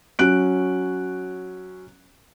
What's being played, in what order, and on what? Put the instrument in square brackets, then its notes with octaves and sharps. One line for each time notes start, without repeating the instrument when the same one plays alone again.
[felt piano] F#3 C#4 F#6 D7